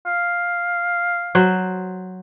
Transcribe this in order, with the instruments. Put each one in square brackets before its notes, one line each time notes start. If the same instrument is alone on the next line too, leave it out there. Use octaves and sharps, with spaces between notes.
[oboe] F5
[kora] F#3 C5